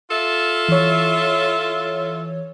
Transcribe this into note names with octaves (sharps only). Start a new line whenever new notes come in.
F4 A4 E5
E3 C#5